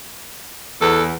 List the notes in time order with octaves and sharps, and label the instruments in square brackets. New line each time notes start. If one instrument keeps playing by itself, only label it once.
[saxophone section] E2 [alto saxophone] A4